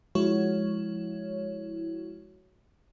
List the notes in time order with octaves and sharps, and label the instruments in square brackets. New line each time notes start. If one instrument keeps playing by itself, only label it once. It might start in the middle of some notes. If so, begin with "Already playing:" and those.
[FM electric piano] F3 G#3 E4 F#4 C#5